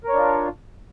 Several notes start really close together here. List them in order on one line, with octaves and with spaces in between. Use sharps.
A#4 C#5 D4 F4